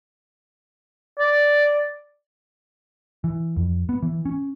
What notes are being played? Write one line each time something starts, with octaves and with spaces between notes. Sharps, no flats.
D5
E3
F2
B3
E3
C#4